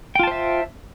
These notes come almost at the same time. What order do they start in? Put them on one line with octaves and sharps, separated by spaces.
G5 F4 A5 C5 E5